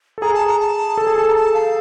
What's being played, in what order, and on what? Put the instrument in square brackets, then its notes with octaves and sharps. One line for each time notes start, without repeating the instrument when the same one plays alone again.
[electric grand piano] A4
[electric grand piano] G#4 [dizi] A#5
[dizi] A5
A#5
A5
[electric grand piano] A4
G#4
A4
[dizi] A#5
A5
F5